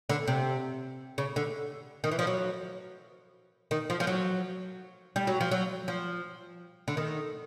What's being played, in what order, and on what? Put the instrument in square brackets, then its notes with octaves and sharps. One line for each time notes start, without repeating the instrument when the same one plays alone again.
[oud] D3
C3
C#3
D3
D#3
E3
F3
F#3
D#3
F3
F3
F#3
G3
F#3
F3
F#3
F3
D3
D#3